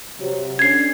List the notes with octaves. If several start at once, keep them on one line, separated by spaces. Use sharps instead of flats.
C3 F#3
D3 C#4 G#6 C7